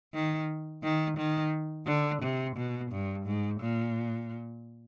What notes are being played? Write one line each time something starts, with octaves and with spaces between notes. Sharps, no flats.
D#3
D#3
D#3
D3
C3
B2
G2
G#2
A#2